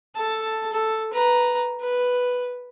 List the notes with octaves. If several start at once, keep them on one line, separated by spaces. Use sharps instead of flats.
A4 A5
A4
B4 A#5
B4